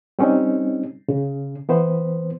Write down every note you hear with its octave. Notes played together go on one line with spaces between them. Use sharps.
G3 C4 C#4 D#4
C#3
E3 B3 C5